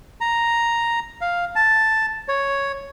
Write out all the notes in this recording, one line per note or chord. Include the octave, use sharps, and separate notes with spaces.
A#5
F5
A5
C#5